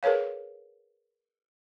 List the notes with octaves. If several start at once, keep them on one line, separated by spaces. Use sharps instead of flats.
G#4 A#4 B4 C#5 F5